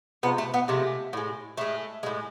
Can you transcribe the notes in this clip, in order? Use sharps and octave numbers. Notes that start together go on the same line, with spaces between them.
C3 F3 G#3 B3
A3
B3
C3 F3 G#3 A3
A2 G#3
A2 G#3 A3
A2 G#3